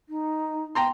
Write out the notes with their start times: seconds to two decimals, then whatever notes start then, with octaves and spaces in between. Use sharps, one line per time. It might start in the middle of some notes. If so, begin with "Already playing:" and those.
0.09 D#4
0.75 G5 A#5 C6